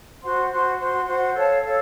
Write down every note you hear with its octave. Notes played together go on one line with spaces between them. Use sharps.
F#4 C5 F#5 C6
F#4 C5 F#5 C6
F#4 C5 F#5 C6
F#4 C5 F#5 C6
A4 C#5 F5 A5
A4 C#5 F5